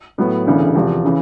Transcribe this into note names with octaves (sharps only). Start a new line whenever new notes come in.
A2 F#3 B3
E1 D2 C#3 E3
E2 C3 F3
C#3 E3